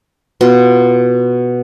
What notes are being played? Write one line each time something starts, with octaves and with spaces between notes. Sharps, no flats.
B2 F4